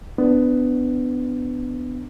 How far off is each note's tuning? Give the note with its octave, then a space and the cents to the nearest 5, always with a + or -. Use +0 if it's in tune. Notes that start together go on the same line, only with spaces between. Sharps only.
B3 +20 D4 +5